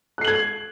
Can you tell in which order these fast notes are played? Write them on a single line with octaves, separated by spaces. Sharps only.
F#6 C7 F#7 G#6